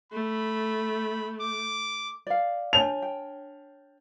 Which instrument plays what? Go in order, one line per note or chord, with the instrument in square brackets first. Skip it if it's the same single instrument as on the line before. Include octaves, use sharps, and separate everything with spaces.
[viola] A3 [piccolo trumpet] B5
[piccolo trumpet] D6
[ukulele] D5 F5
[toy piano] D4 C#5 A5 [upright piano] F7
[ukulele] G5